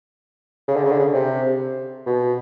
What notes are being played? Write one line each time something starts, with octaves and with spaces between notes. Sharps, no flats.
C#3
D3
C#3
D3
C#3
C3
B2